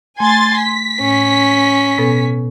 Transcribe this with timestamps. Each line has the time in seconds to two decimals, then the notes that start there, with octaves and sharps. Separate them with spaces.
0.20 A3 G#5 C6 A6
0.60 B6
1.00 A2 C#4
1.98 B2 B3 A4